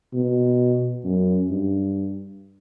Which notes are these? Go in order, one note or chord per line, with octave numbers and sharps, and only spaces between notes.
B2
F#2
G2